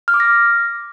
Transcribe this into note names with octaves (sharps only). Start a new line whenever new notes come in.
F6
D6
A#6